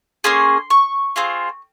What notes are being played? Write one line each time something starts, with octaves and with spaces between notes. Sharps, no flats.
A#3 C#4 G#4 C6
C#6
C4 F4 G#4